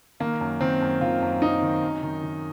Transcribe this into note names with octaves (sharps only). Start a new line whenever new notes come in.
D#3 A#3
F#2
D#3 C4
F#2
D#3 F4
F#2
F#2 D#4
D#3
F#2
D#3
D#3